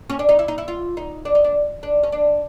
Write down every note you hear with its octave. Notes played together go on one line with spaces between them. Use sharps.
C#4
D4
D#4
E4
D#4
E4
F4
D#4
D4
D#4
D4
D4
C#4
D4